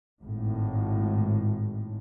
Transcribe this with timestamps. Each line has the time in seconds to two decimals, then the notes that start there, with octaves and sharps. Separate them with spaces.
0.22 G#1 A2